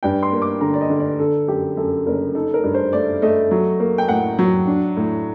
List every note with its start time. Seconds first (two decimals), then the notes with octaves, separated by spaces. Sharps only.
0.03 G2 G5
0.23 C6
0.32 A#3
0.42 D6
0.61 D3 A#5
0.74 D5
0.81 D#5
0.90 D3
0.99 D5
1.19 D3 A4
1.48 F#2 G4
1.77 F#2 A4
2.06 F#1 A#4
2.35 D#4 A4
2.54 A#4
2.63 G2
2.74 C5
2.93 A3 D5
3.22 A3 D#5
3.51 F#3
3.80 A#3
3.98 G5
4.08 A2 F#5
4.39 F#3
4.67 D4
4.97 A2